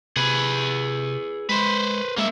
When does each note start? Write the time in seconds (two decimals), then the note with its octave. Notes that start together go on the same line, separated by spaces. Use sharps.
0.16 C3 G#4 B4
1.49 G#3 B4 C5
2.17 G#3 A#3 E5